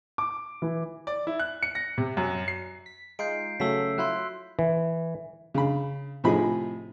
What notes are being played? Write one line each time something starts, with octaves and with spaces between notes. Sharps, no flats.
D6
E3
D5
E4
F#6
C#7
A#6
C3
F#2
C7
B6
G#3 D#4 F4 G6 C7 D7
C#3 F#3 A3 E6 B6
F#3 E4 F4 C6 F#6
E3
C#3 B5
A2 C3 F3 D#4 G#4 B5